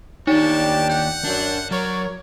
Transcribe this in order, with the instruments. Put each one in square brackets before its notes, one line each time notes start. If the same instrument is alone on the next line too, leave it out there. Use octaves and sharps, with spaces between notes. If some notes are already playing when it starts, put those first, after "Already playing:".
[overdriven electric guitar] D#2 C#5 [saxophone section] A#2 D4 G4 [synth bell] D#4 [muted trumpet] A5
[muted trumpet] F#5 [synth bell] G6
[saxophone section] F#2 [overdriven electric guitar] D4
[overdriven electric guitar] F#3 [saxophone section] A#4 C#5 [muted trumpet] D5